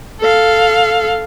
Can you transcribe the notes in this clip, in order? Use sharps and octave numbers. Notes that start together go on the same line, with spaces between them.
A4 F5